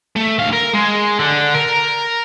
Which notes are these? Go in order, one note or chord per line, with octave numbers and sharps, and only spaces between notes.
A3
D2 F5
A#4
G#3
D3
A#4